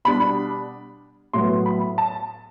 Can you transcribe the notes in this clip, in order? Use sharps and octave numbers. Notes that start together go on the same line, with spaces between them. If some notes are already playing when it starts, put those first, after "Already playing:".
B2 G3 D4 B5
A2 F#3 B3 C6
B5
A5